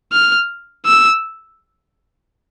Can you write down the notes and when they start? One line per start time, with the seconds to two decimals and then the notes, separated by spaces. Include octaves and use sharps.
0.13 F6
0.86 E6